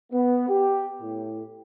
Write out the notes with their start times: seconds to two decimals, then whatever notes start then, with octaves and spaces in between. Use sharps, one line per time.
0.12 B3
0.49 G4
1.01 A2